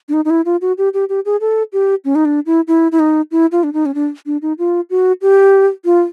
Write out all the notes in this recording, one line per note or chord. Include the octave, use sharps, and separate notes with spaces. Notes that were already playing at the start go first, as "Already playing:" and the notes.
D4
D#4
D#4
E4
F4
F#4
G4
G4
G4
G#4
A4
G4
C#4
D#4
D4
E4
E4
E4
D#4
E4
F4
D4
D#4
C#4
D4
D4
D#4
F4
F#4
G4
F4